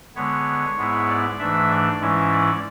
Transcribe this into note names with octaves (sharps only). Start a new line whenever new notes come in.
D3 G#3 B3 C#5
G#2 G#3 B3 E4
D5
G#2 E3 A3 D4 E5
D5
G#2 E3 G#3 C#4 E4
D5